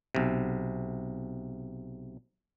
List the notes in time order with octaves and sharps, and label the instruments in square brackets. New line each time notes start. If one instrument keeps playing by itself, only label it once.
[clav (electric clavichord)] B1 C3